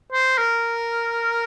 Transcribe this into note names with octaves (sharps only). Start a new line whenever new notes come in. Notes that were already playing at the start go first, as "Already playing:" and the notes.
C5
A#4